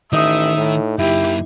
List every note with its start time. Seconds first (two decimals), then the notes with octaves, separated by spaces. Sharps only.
0.13 A1 D#3 D#4 E5 D#6
0.57 A2
0.99 F#2 A#3 E4 G4